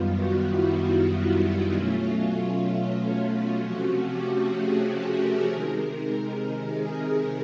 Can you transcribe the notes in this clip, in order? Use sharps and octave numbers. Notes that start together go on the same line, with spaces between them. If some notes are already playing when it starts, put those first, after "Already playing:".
Already playing: F#2 D#3 G3 B3 F4
F#4
E4
F4
B2 F#3 A3 C#4 F4
C3 F3 A3 C#4 F#4
G4
G#4
A4
A#4
C3 D#3 G#3
G#4
G#4